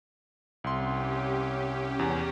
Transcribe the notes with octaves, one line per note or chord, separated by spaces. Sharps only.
C2 C#4 G4 C6
E2